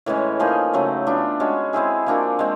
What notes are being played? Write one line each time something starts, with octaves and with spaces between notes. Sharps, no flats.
A2 E3 G#3 C#4
F3 A#3 D#4 G#4
C#3 F#3 A3
B3 D4 F4
G#3 C#4 F#4
G#3 C4 E4 G#4
F3 A#3 D4 F#4
G#3 C4